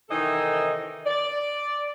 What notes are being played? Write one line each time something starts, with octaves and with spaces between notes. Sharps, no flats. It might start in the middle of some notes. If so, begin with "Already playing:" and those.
C3 D#3 E3 D#4 A4 D#5
D5